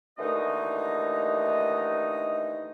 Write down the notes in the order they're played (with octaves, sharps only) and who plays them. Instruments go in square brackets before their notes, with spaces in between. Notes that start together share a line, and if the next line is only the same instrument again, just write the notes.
[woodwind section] D#2 D3 E3 A3 D#4 D#5